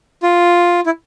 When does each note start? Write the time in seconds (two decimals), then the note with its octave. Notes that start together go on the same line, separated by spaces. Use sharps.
0.23 F4
0.86 E4